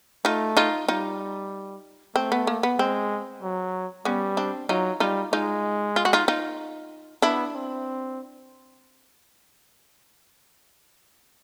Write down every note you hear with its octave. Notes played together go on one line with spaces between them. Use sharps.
A3 D#4 F4
D#4 F4
G3 D#4 F4
A3 C4
B3
A#3
B3
G#3 C4
F#3
G3 B3 C#4
C4 D4
F#3 D#4 F4
G3 D#4 F4
G#3 D#4 F4
F4
F#4
D#4 F4
D#4 F4
B3 D4 E4
C4